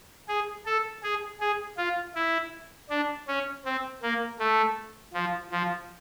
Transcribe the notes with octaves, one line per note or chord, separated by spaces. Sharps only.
G#4
A4
G#4
G#4
F4
E4
D4
C#4
C4
A#3
A3
F3
F3